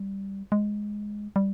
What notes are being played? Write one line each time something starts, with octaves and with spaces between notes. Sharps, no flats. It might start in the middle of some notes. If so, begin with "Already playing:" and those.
Already playing: G3
G#3
G3